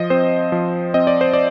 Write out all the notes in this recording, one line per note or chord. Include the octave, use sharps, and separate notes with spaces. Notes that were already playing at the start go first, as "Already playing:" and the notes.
Already playing: F3 D#5
C4 C5
F3
C4 D#5
D5
C5
D5